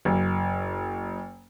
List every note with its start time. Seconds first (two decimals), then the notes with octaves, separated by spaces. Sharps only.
0.05 F#1